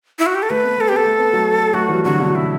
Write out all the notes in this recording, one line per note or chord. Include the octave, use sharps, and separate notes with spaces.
E4
F#4
G4
A4
A3 B4
B3
A3 A4
G4
B3 A4
A3
B3
F#3 A3
F#3 A3 F#4
E3 G3
D3 F#3 F#4
B2 D3
B2 E4